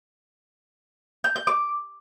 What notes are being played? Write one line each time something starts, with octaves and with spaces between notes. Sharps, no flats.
G6
G6
D6